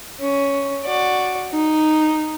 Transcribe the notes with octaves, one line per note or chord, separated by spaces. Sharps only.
C#4
F#4 D5
D#4